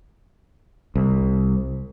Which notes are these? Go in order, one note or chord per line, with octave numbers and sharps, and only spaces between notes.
C2